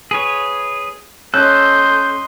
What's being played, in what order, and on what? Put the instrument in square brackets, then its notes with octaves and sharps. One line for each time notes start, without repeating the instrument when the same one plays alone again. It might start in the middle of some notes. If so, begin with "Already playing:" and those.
[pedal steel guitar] G#4 B4 C#5
[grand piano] C#4 F#6 [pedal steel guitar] A4 [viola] D#5 C6 [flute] G6